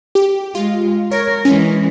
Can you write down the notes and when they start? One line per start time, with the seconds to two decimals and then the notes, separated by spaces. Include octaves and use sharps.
0.15 G4
0.55 G#3 F4
1.11 A#4 C#5
1.45 E3 G#3 C#4